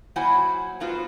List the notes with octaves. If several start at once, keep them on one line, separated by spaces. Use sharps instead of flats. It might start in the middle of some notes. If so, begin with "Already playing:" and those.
F#3 A#3 E4 C5 F#5 G#5
G#2 F#3 B3 F4 F#4 C5